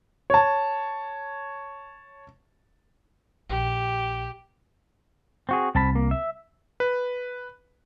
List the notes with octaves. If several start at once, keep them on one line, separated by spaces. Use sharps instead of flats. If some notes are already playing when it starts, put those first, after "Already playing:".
C#5 A5
A#1 G4
C4 F#4 G#4
C2 C4 A5 B5
A#3
E5
B4